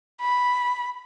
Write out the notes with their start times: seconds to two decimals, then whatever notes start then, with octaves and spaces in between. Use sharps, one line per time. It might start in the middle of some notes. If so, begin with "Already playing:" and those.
0.21 B5